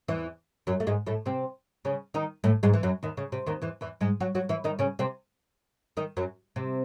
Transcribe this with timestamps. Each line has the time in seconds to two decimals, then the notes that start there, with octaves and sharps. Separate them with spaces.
0.08 E2 E3
0.67 F#2 F#3
0.80 A3
0.87 G#2 G#3
1.06 A2 A3
1.26 C3 C4
1.85 C#3 C#4
2.14 D#3 D#4
2.44 A2 A3
2.63 G#2 G#3
2.74 E3
2.83 F#2 F#3
3.03 D#2 D#3
3.17 C#3
3.32 C3
3.46 D#2 D#3
3.62 E2 E3
3.81 E2 E3
4.01 G#2 G#3
4.20 F#3 F#4
4.35 F#3 F#4
4.49 E3 E4
4.64 D#3 D#4
4.79 C#3 C#4
4.99 C3 C4
5.97 D#3 D#4
6.17 F#2 F#3
6.56 C3